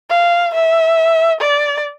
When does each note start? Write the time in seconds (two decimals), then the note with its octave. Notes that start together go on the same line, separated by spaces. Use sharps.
0.10 F5
0.54 E5
1.41 D5